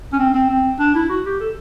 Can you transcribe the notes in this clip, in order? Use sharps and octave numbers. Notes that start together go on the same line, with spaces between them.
C#4
C4
C4
C4
D4
E4
F#4
G4
A4